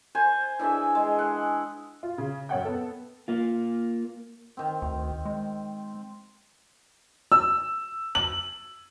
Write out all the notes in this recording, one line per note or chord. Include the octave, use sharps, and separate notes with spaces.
C5 G#5
E3 D4 G#4 E5
G#3
F#5
F4
C#3
F#2 C#5 F#5 G5
B3 A4
A#3 F4
D#3 C4
D2
G#3
E6
F#7